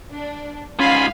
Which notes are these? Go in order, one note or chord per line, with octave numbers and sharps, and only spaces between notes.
D4
G#2 C#4 F4 F5 G#5 B5